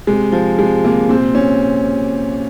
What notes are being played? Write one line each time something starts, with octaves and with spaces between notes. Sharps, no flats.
C3 G#3
F3
C3 G#3
C3 A#3
A#2 C4
A#2 C#4